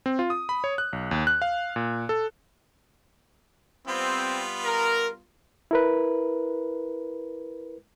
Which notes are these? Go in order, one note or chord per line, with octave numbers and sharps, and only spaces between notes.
C4
F4
D#6
B5
C#5
F#6
B1
D#2
F#6
F5
A#2
A4
G3 B3 C4 F4
A#4
E4 A#4 B4